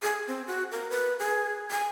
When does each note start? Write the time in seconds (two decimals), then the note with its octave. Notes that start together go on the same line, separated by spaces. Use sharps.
0.03 G#4
0.27 C4
0.47 F#4
0.71 A#4
0.90 B4
1.19 G#4
1.71 G#5